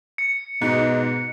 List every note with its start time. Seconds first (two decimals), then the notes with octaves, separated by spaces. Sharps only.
0.18 C#7
0.62 G#2 B2 D#5